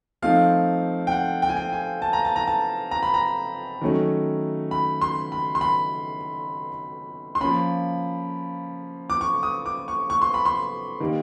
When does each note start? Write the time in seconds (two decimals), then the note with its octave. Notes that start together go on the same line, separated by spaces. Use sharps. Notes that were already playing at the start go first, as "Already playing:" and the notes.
0.22 F3 A3 C4 D#4 F5
1.07 G5
1.12 F#5
1.42 G5
1.49 G#5
1.57 G5
1.73 G#5
2.02 A5
2.13 A#5
2.25 A5
2.36 A#5
2.47 A5
2.91 A#5
3.03 B5
3.14 A#5
3.81 D#3 F#3 A3 C#4
4.71 B5
5.01 C6
5.32 B5
5.55 C6
5.61 B5
7.35 C6
7.41 F3 A#3 C#4 B5
9.10 D6
9.21 C#6
9.43 D#6
9.66 D6
9.88 C#6
10.10 C#6
10.22 C6
10.34 B5
10.45 C6
11.00 D#3 G3 A#3